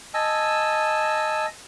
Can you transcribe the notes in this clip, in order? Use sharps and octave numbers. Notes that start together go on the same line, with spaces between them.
D#5 G#5 A5 E6